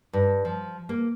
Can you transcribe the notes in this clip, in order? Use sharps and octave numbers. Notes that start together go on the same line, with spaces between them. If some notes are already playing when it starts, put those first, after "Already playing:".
G2
F3
A#3